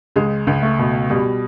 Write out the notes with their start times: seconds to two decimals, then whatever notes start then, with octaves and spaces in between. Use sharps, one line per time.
0.16 C#2 G#3
0.47 C#2
0.62 A3
0.79 B2
1.09 B2 G3